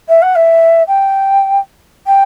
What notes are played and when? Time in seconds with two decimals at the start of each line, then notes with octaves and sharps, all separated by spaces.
0.09 E5
0.22 F#5
0.35 E5
0.88 G5
2.07 G5